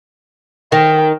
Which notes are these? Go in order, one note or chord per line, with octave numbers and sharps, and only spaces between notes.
D#3 G5